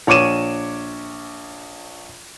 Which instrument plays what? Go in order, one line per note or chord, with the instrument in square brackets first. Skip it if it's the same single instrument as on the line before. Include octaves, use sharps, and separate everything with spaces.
[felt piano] A#1 C#5 C#6 D6 D#7 E7